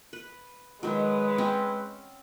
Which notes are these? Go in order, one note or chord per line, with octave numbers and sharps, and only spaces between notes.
B4
D#3 F#3 G#3 B4
C4 C#4